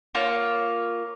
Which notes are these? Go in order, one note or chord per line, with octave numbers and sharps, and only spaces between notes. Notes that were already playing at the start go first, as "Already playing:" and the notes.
A#3 F4 C#5